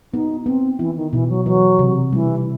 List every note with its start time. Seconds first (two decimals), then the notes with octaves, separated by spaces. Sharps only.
0.13 B3 D#4
0.46 B3 C4
0.79 E3 E4
0.96 D#3
1.13 B2 E3
1.29 F#3
1.46 E3 F#3
1.79 C3
2.12 E3 G3